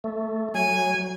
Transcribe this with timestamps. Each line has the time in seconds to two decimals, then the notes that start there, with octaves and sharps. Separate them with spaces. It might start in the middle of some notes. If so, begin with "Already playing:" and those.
0.04 A3
0.54 F#3 G#5